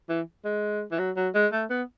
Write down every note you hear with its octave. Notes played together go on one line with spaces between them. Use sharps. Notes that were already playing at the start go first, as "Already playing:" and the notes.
E3
G#3
E3
F#3
F#3
G#3
A3
B3